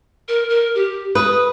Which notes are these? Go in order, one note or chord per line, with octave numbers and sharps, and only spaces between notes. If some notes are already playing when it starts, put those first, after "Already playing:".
A#4
A#4
G4
B4 D#6